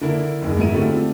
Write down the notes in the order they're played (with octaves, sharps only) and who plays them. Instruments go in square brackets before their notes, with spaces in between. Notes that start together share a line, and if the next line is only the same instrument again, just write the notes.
[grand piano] D3 A#3 E4
F#1 D#2 G#4
G#2 B3 E4 D#7
D3 G3 A3 C4 F4